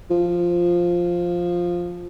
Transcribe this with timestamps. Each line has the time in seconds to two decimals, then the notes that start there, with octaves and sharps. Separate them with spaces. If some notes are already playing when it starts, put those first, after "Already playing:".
0.10 F3